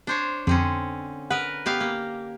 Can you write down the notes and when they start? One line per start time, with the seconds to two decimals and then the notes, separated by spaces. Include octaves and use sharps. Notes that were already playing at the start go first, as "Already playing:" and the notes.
0.07 D4 C5 C#5
0.47 F2 D3 C4 C#4
1.30 A#4 B4 F#5 D#6 D#7
1.66 B3 G4 F5
1.80 A#3